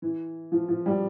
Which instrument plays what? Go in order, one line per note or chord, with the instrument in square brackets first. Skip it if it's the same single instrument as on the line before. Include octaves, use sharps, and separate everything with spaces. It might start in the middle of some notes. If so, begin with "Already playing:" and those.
[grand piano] E3
F3
F3
G3